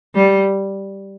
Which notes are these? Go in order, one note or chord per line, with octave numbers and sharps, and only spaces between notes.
G3